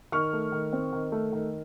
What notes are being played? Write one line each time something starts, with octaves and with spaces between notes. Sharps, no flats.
D#3 C#6 F6
A3
D#3
C4
D#3
A3
D#3